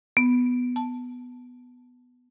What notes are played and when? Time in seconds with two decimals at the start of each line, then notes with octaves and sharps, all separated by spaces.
0.17 B3
0.76 A5